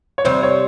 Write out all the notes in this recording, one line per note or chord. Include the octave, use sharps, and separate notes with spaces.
C#5
C3 G3 C4 C5
C#5